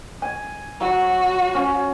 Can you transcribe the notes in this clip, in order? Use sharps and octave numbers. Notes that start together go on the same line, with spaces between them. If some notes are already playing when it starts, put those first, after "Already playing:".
G#5
F#3 F#4
C#4